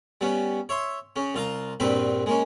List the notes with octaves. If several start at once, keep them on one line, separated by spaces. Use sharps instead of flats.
G3 B3 C#4
C#5 E5 C6
C#3 C#4
C2 F4 F5 A#5
A#1 G2 A#2 C4 B4 C5
G#3 A#3 C#4